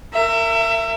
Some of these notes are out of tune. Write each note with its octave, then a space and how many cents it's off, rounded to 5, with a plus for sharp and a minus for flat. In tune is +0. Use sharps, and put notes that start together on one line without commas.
A#4 -25 E5 +25